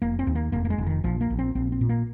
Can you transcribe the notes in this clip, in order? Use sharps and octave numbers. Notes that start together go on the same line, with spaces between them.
F1 A#3
C4
D#2
A#3
F1 A#3
A#3
G#3
F1
D#3
A#1 F3
A#3
A#1
C4
A#1 C4
C4
A#2
A#3